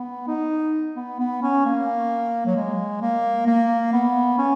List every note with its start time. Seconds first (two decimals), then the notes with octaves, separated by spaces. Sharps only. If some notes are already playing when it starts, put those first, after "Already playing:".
Already playing: B3
0.28 D#4
0.96 B3
1.20 B3
1.42 C#4
1.65 A#3
2.46 F#3
2.56 G#3
3.01 A#3
3.47 A#3
3.93 B3
4.38 C#4